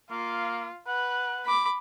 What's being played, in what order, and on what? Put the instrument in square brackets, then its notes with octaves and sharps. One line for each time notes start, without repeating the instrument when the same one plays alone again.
[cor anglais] A#3 [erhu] F4
[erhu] B4 [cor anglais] F#5
[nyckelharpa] B5 D6